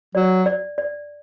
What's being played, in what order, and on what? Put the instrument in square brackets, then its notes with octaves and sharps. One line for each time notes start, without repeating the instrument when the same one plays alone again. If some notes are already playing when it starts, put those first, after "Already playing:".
[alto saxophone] F#3 [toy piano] D5
[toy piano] D5
D5